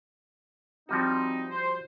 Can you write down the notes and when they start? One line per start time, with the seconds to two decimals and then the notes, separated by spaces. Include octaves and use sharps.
0.89 F3 G3 C4 D#4 F#4
1.50 C5